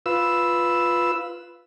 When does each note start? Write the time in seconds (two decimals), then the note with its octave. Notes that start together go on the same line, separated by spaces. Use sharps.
0.06 F4 B4 E6